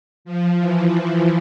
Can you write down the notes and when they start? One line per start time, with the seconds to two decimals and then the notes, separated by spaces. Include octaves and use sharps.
0.25 F3
0.59 E3